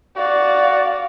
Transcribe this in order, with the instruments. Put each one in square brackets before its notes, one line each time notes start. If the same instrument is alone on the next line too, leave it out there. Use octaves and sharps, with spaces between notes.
[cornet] F#4 [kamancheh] D5 F5